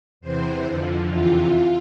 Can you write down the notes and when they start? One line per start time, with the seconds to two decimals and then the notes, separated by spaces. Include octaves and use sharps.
0.21 E2 C3 E3 C5
0.64 F2 D3 F3
1.08 E2 C3 E3 F4